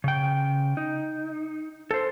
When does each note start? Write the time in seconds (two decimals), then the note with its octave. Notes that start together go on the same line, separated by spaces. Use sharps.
0.04 C#3 G5
0.77 D#4
1.91 A4 C5